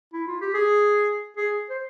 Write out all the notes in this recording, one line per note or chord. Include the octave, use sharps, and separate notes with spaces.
E4
F4
G4
G#4
G#4
C5